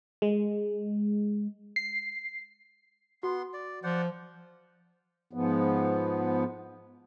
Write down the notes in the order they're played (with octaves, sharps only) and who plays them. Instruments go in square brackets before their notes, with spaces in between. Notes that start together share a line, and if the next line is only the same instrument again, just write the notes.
[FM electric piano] G#3
C7
[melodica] B3 C6 [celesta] F#4
[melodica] D5
[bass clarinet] F3 [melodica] C5 D5 F#5
[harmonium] G#2 F3 B3